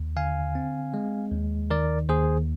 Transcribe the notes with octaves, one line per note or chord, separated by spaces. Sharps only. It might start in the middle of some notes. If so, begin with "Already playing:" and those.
Already playing: D#2
D3 F5 G#5
C4
G#3
D#2
D#3 A#4 D5
D#2 G#4 C5